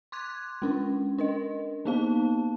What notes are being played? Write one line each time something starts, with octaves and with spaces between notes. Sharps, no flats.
C6 D6 F#6 G#6
G#3 C#4 D4
D4 A#4 D#5
A#3 B3 D#4 F5 A5